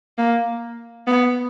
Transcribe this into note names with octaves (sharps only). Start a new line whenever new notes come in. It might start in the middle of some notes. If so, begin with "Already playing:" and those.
A#3
B3